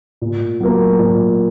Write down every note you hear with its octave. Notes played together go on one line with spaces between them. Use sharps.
A#2
F#3 A#3
A#2